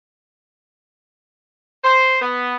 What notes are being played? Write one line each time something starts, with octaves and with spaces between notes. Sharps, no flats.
C5
B3